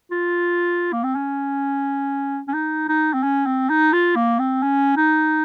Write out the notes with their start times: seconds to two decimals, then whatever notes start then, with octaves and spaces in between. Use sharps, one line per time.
0.11 F4
0.93 A#3
1.04 C4
1.15 C#4
2.48 C#4
2.54 D#4
2.89 D#4
3.13 C4
3.23 C#4
3.46 C4
3.70 D#4
3.93 F4
4.16 A#3
4.39 C4
4.63 C#4
4.97 D#4